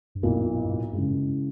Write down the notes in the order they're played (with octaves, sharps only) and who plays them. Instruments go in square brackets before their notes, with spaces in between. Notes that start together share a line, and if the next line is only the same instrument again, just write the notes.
[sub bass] G2
[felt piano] B1 A#2 A#3 E4 [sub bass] E2
[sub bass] G2
G2
G#2
[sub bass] G2 [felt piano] C#3 E3 G#3